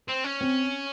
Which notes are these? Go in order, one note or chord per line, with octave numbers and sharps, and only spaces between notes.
C4
C#4
C4